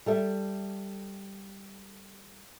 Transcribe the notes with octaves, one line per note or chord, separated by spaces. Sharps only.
G3 A4 E5